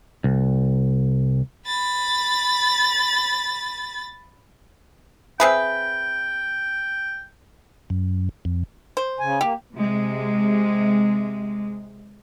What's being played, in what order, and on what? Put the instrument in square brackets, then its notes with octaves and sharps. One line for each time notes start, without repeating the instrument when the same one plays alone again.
[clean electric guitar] C2
[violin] B5 A6
[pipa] C4 G#4 B4 [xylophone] E5 [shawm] G5
[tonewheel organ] F#2
F2
[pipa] C5
[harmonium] C#3 G#5
[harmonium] A#3 [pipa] G4
[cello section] C3 G#3